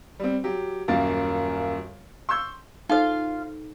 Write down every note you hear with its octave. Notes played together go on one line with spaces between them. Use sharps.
G3 C4
F#3 G4
D#1 F#2 A#3 A#4 A6
C6 C#6 E6 G6
D#4 F4 A4 C5 F5